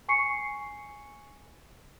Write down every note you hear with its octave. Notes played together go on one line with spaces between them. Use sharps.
G#5 C#6 C7 C#7